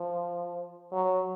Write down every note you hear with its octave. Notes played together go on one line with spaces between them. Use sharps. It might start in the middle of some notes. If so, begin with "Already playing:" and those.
Already playing: F3
F#3